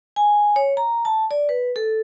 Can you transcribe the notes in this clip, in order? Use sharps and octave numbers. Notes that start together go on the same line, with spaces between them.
G#5
C#5
A#5
A5
D5
B4
A4